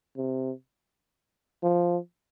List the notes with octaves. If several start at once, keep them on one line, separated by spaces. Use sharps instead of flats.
C3
F3